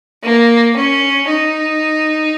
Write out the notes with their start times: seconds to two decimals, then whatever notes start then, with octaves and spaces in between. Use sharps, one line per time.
0.23 A#3
0.76 C#4
1.28 D#4